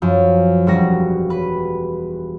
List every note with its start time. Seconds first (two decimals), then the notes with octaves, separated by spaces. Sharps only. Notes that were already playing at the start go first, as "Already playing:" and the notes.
0.02 F#2 F3
0.67 E1 G3 F#4 A#6
1.30 B4